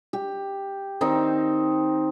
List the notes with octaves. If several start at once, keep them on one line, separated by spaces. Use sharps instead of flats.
G4
D#3 C4 D#4